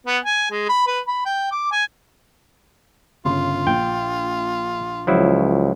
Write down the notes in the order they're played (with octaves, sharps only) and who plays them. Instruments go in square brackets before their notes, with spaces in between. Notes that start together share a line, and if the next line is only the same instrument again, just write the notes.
[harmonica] B3
G#5
G#3
B5
B4
B5
G5
D6
G#5
[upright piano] G1 C#3 C6 [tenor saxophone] F4
[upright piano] A#1 [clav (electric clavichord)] G5
[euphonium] C#2 [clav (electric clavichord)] F3 F#3 E4